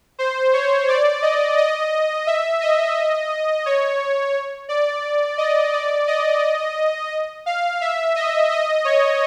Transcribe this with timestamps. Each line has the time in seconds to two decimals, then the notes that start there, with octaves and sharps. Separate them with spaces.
0.19 C5
0.53 C#5
0.89 D5
1.22 D#5
1.57 D#5
2.27 E5
2.61 D#5
3.66 C#5
4.69 D5
5.38 D#5
5.73 D5
6.07 D#5
7.46 F5
7.81 E5
8.16 D#5
8.51 D#5
8.85 C#5